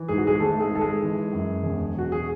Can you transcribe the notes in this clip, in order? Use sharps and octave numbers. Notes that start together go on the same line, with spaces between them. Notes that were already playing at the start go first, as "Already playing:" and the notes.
Already playing: E3
G#2 G#4
F#4
G#3 G#4
G#1 A3 A4
G#3 G#4
G#1 A4
G#3 G#4
E3
F#2
E1
E1 F#4
G#4